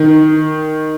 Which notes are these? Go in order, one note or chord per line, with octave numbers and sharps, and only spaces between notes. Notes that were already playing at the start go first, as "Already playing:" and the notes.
Already playing: D#3